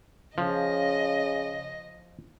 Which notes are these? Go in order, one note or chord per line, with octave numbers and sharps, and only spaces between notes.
C#3 F3 D#5